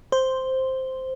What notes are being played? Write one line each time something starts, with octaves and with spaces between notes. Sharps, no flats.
C5